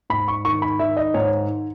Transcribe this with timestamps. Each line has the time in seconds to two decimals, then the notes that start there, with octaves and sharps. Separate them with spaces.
0.10 G#2 B5
0.28 C#6
0.45 D#3 C#6
0.62 B5
0.79 D#3 E5
0.97 D#5
1.14 G#2 C#5